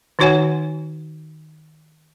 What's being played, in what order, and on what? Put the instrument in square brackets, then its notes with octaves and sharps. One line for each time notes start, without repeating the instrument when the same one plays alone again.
[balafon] D#3 D#4 F#4 C#5 F#5 G#5